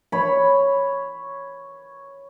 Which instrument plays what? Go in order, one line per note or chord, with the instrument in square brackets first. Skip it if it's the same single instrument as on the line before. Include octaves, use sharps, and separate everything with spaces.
[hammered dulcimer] C#5 B5